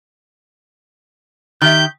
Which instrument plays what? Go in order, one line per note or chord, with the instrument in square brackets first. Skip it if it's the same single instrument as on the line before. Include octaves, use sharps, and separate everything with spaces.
[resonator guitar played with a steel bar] D#3 G4 E5 [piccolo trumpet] G6